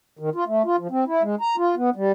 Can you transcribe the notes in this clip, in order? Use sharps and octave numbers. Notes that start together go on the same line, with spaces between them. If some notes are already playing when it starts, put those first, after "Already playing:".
D#3
F4
A3
F4
F3
C4
E4
G#3
A#5
F4
B3
G3